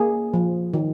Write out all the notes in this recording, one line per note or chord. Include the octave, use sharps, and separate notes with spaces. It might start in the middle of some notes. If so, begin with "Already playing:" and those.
Already playing: A#3 G#4
F3
D#3